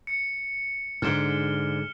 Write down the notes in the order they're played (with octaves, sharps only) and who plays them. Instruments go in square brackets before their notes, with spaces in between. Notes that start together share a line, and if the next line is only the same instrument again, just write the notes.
[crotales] C#7
[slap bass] G#2 D3 [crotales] F6 E7 G7